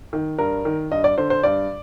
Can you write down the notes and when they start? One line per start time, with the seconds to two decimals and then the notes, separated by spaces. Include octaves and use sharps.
0.13 D#3
0.39 G2 A#4
0.65 D#3
0.91 G2 D#5
1.04 D5
1.18 D3 C5
1.30 C5
1.43 G2 D5